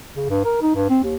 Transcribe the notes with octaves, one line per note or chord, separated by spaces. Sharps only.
C#3
G2
A#4
D#4
G2
C4
D#2